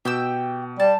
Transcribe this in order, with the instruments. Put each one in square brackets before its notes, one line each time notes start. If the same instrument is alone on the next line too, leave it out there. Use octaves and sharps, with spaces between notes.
[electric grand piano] B2 [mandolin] G4 G5 E6
[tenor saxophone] G3 [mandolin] A5